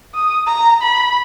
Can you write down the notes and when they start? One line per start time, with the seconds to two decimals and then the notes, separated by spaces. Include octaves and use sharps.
0.15 D#6
0.47 A#5
0.82 B5